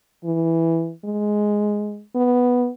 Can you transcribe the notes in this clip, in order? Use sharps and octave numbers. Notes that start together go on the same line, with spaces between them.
E3
G#3
B3